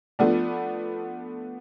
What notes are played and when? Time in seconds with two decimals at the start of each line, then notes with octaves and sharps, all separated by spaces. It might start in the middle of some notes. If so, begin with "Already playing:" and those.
0.19 F3 A3 B3 D4